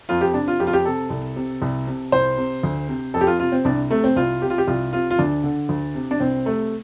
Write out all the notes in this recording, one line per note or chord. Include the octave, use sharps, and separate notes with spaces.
F2 F4
G4
C3 D4
F4
F2 G4
F4
G4
C3 A4
C2
C3
C2
C3
C2 C5
C3
D2
C3
F2 A4
G4
F4
C3 F4
C4
C2 D4
C3 A3
C4
C2 F4
C3 G4
F4
G4
C2 F4
C3 F4
F4
D2 D4
D3
D2
C3
D4
C2 C4
C3 A3